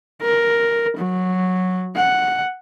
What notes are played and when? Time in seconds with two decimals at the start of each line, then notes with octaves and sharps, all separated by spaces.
0.22 A#4
0.97 F#3
1.95 F#5